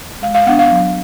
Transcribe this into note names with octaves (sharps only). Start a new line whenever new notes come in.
G#3 F5
F5
B3 D4 F#5
F5
F#3